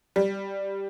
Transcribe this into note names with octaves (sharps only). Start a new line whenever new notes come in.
G3